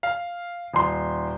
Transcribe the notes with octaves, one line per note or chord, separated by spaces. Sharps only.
F5
D#1 C6